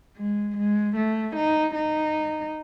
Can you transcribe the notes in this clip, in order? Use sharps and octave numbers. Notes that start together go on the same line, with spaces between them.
G#3
G#3
A3
D#4
D#4